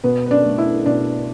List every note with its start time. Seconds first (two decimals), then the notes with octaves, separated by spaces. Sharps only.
0.04 B2 B3 B4
0.26 B4
0.31 D4 D5
0.45 A3
0.58 E4 E5
0.86 B2 D4 D5